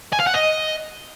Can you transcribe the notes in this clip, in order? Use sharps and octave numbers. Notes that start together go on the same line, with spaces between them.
G#5
F5
F#5
D#5